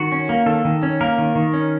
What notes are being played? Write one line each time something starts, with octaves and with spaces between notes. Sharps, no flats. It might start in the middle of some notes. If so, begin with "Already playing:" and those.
Already playing: D#3 F#4
C#4
A#3
D#3 A4
D#3
C#4
A#3 A#4
D#3
D#3
C#4